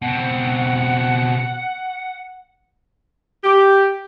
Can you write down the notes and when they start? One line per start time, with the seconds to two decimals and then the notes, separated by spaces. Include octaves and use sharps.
0.02 B2 C4 F#5
3.43 G4